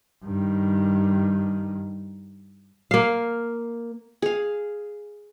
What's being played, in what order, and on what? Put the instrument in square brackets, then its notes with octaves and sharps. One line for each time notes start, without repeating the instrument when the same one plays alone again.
[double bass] G2 D#3
[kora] A#3 F5
[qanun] G#4 F5